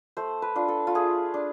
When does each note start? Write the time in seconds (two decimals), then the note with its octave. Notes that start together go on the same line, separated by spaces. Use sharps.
0.17 A3 C5
0.42 B4
0.55 D4 F4
0.68 A4
0.87 F4
0.95 A3 G#4
1.34 D4